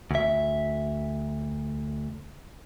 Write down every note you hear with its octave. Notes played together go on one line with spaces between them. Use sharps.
D2 E5